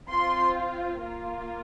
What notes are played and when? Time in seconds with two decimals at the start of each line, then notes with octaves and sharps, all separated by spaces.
0.10 C4 F4 C6
0.99 A#3 F4